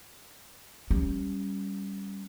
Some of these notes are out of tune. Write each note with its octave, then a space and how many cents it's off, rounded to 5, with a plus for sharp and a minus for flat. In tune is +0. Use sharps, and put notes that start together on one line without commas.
G3 +0 C#4 +0